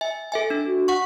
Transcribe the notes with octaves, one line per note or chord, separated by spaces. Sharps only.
E5 G#5
A4 E5 G#5
D4
F#4
F#5 C#6